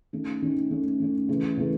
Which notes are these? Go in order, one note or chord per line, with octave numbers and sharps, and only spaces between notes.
D#3 A3 C#4
D#3 A3 C#4
D#3 A3 C#4
D#3 A3 C#4
C#3 E3 A3
C#3 E3 A3